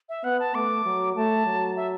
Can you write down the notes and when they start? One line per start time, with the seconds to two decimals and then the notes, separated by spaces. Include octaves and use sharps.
0.09 E5
0.24 B3 F#5
0.40 A5
0.55 A3 D6
0.85 F#3
1.16 A3 A5
1.46 F#3
1.77 E5